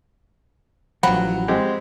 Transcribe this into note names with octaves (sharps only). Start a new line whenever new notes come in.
A1 F3 F#3 F#5 G5 B5
G#3 C4 G4